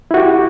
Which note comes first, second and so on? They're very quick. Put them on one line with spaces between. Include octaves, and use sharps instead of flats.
E4 F#4 G4